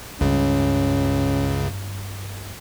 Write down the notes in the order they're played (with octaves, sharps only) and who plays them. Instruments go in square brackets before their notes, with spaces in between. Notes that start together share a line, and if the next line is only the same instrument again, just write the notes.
[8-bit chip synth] C#2 C#3 [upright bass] G2 [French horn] C#4